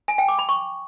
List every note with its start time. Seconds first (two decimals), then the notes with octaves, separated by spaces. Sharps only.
0.08 G#5
0.18 G5
0.28 D6
0.39 B5
0.49 C#6